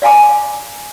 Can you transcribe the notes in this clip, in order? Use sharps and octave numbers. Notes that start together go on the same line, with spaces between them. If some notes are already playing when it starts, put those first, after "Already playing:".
D5 F5 G#5 A#5 D6